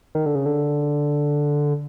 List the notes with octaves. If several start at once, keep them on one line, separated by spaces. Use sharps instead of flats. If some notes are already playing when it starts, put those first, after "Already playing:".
D#3
D3
C#3
D3